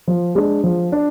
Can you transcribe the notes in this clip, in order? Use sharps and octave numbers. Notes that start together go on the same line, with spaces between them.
F3
G#3 D4
F3
D4